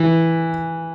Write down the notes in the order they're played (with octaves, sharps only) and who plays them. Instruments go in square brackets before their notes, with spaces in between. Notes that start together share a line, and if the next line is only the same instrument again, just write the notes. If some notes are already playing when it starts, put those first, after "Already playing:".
Already playing: [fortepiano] E3